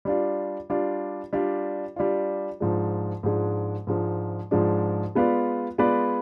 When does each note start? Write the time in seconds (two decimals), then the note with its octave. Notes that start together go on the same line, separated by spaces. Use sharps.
0.05 G3 D4 F4
0.70 G3 D4 F4
1.33 G3 D4 F4
1.96 G3 D4 F4
2.60 G#2 F3 G#3 D4
3.23 G#2 F3 G#3 D4
3.87 G#2 F3 G#3 D4
4.51 G#2 F3 G#3 D4
5.15 G#3 B3 F4 B4 D5
5.78 G#3 B3 F4 B4 D5